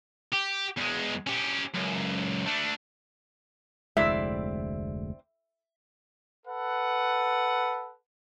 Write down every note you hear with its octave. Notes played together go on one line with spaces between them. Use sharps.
G4
E2 G#3
C#4 G4
C#2 F#2
A3 D4
F1 D2 G#3 C4 E4 D5 E5
A4 B4 F#5